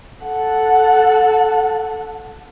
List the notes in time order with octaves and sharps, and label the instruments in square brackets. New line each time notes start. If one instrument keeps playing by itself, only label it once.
[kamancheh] A4 F#5